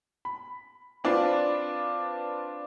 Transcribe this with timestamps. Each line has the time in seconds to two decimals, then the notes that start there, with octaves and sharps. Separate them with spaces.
0.25 B5
1.04 C4 D4 F4 B4 D5